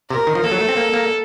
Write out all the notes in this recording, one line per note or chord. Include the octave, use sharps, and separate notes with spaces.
C3 A#4
D#3
F3
A#3 A4
F#3
A3
C4
A#3
A#3